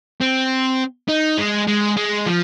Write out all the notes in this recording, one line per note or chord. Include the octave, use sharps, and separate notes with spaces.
C4
D#4
G#3
G#3
G#3
F3